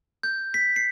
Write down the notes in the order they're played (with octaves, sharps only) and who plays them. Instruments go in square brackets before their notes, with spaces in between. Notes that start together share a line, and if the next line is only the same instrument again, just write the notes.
[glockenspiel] G6
B6
C7